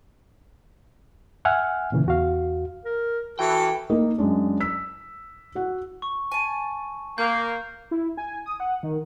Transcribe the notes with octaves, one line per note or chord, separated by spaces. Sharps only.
E5 F#5 G#5 F6
A#2 C#3 E3
E2 F#4 F5
A#4
E3 F#4 A4 G5
A#3 D#4 D#5
F#2 G#3 D4
E6 B6
F#4 F#5
C#6
G#5 A5
A#3 G6
E4
G#5
D#6
F#5
D#3